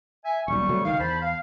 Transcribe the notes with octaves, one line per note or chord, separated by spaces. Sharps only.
E5 G#5
D#1 B1 G3 C#6
C3 F#3 A3
C#2 D#3 F5
E2 C5 A5 B5
F5